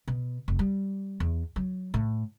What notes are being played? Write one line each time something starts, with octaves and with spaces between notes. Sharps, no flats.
B2
F1
G3
E2
F#3
A2